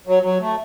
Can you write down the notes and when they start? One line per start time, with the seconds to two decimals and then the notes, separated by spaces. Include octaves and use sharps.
0.07 F#3
0.23 F#3
0.41 A3